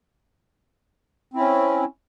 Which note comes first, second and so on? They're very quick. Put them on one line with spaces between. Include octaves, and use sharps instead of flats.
C4 E4 C#4